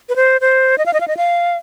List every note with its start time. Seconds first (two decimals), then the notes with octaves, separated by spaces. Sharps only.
0.09 B4
0.16 C5
0.41 C5
0.78 D#5
0.86 F5
0.93 D#5
1.00 F5
1.08 D#5
1.17 F5